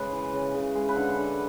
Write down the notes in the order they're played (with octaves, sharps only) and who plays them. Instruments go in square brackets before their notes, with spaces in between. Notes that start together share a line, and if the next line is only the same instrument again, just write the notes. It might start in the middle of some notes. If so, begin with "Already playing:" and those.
Already playing: [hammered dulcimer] C#3 G#3 B4
E3
C#3
C#3
G#3
B4
D3 A4
D3